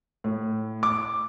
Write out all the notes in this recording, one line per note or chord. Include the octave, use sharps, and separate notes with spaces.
A2
D6